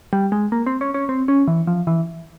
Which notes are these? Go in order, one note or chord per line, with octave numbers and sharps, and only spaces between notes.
G3
G#3
A#3
C4
C#4
C#4
C4
C#4
E3
F3
E3